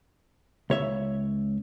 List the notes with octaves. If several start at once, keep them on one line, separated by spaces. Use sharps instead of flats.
C#2 C#5 E5